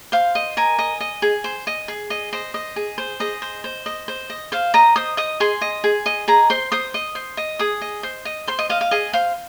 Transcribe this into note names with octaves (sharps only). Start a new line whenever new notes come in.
C5 F5
D#5
A#4 G#5
D#5
D#5
G#4
C5
D#5
G#4
D#5
C5 D#5
D#5
G#4
C5
G#4 D#5
C5
C5
D#5
C5
D#5
C5 F5
D#5 A#5
C5 D#6
D#5 D#6
G#4 C6
D#5
G#4
D#5
G#4 A#5
C5 C6
C5 D#6
D#5
C5
D#5
G#4 D#6
D#5
C5
D#5
C5 C6
D#5
D#5 F5
F5
G#4 D#5
C5 F5